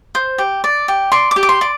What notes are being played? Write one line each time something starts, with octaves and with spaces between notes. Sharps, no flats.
C5
G4
D5
G4
D5 C6
D6
G4
D6
C6
D5